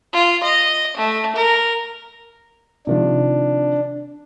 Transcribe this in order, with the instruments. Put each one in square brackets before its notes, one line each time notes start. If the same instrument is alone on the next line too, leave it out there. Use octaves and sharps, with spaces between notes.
[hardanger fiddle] F4
D#5
A3
A#4
[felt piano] C3 D#3 F3 [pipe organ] D4